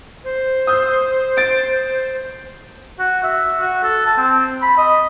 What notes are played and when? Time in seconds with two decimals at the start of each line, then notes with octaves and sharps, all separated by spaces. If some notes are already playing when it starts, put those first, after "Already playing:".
0.24 C5
0.67 D#6 E6 G6
1.37 A6 D7
2.99 F#4
3.24 E5
3.60 F#4
3.84 A4
4.06 A5
4.18 C4
4.62 B5
4.78 D#5